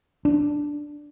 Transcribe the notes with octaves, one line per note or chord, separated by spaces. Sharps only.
D4